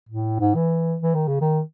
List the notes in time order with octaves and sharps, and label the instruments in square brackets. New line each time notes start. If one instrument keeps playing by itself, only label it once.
[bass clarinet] A2
G#2
E3
E3
D#3
C#3
D#3